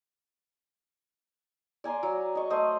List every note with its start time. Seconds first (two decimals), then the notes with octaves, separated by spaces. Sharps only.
1.84 D5 G#5 A#5 C6
2.03 F#3
2.35 D#5 C#6
2.50 A3 C5 D#5 D#6